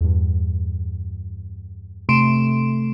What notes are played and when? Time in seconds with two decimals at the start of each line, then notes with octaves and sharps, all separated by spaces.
0.01 E2 G2
2.09 C3 A3 C6 D7 E7